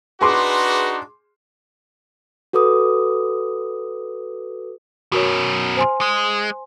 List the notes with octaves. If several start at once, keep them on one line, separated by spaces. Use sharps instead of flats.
D4 D#4 F#4 G#4 B4 C6 D6
F#4 A4 B4 D6 D#6
F#2 B2 F#4 A#4 C#5
C5 G#5 C6
G#3